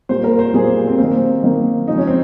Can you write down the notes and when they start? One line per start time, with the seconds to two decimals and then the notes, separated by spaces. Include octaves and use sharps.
0.09 A#2 G3 A#3 C5
0.24 A#4
0.39 C5
0.54 A#2 G3 A#3 G#4
0.87 C4
0.98 D#3 A#3 C4
1.43 D#3 A#3
1.87 C#3 F3 G#3 D#4
1.98 C#4
2.07 C4